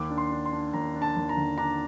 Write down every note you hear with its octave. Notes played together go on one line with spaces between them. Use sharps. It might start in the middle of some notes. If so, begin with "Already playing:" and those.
Already playing: D#2 D6
D4
C6
D4
C6
D4
D#2 A#5
D4
A5
D#2
A#5
D3
D4 A#5